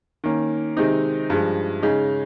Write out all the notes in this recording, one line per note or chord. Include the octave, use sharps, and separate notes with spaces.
D#3 A#3 C#4
C3 D#3 G#3 C4 D#4
G2 F3 G#3
C#3 G#3 D#4